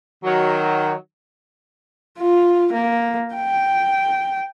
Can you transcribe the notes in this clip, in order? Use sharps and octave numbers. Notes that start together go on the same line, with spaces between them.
D#3 F#3
F4
A#3
G5